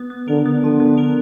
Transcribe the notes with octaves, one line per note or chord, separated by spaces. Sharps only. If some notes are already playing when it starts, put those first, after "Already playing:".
Already playing: B3
B3
D3 A#4
B3
D3 F3
B3
A#4